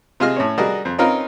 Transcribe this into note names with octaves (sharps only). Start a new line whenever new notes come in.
C3 F4 G#4 D#5 C6 F6
A2 C#4 C#5
G3 D4 F#4 G#4 A#4 D#5
F2
C4 C#4 D#4 F4 A#4 B4